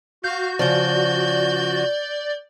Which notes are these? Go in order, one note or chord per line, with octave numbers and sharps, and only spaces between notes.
F#4 F5 G6
C#3 F3 D5 G6